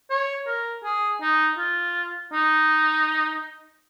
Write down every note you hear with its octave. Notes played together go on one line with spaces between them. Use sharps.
C#5
A#4
G#4
D#4
F4
D#4